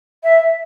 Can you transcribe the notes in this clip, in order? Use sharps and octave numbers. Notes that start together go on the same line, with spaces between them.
E5